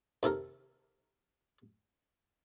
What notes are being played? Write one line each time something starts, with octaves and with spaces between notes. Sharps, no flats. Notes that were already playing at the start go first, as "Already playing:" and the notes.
D#2 C3 A4 A#4